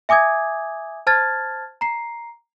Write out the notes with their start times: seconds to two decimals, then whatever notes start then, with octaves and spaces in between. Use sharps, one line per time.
0.09 E5 G#5 D6 D#6 G#6
1.07 C5 A5 F6 G#6 A6
1.81 A#5 C7